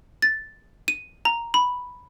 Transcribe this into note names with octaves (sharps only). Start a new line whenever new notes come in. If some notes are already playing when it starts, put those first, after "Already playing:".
A6
D#7
A#5
B5